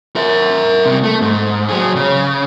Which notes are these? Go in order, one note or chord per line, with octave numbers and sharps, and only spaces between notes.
A#4 E5
C3 G3
A3
G#2
F#3 G#4
C#3